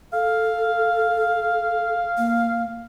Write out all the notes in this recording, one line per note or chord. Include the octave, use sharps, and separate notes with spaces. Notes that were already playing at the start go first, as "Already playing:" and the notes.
A4 F5
A#3